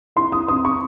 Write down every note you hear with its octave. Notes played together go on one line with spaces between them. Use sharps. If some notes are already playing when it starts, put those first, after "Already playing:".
E4 C6
D#6
C4 D#6
C#6